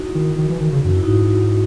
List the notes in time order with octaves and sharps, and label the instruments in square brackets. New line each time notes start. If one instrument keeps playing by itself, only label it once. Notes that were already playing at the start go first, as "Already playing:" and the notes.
Already playing: [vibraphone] D#4 E4 F#4
[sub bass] D#3
D#3
E3
D#3
C#3
[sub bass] F#2 [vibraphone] F#4
[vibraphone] E4
[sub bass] G#2 [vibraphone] D#4 F#4